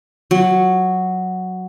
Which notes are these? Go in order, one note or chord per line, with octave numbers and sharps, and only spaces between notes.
F#3